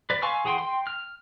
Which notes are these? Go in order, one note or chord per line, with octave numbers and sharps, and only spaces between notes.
B4 D5
F5 G#5 C6 C#6 E6
E3 G#4 F#5 G5 C6
G5 C6
F6